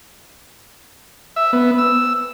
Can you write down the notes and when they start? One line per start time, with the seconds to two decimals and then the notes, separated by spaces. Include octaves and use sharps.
1.36 E5
1.53 B3
1.78 E6